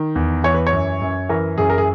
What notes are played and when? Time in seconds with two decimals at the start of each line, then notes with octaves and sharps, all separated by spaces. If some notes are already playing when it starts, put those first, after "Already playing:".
Already playing: D#3
0.15 E2
0.44 E3 C#5
0.54 B4
0.67 C#5
0.73 F#2
1.02 F#2
1.29 E3 A#4
1.58 F#2 G#4
1.70 A#4
1.78 G#4